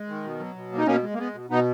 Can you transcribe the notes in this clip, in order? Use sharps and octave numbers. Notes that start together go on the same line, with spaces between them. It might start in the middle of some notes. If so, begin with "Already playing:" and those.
Already playing: G#3
D#3
B2
F#3
B2
A#3
D#4
B2 A#3 C#4
G#3
A#3
G#3 B3
B2
B2 B3 D#4